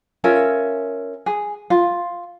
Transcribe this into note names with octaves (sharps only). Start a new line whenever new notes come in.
C#4 F4 A#4 E5
G#4
F4